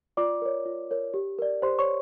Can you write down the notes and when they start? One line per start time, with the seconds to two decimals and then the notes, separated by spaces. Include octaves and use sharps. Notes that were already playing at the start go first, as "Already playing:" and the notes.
0.17 F4 D5 D6
0.42 A#4 C#5
0.66 F4
0.91 A#4 C#5
1.14 G4
1.39 A#4 D5
1.62 G4 C5 C6
1.79 C#5 C#6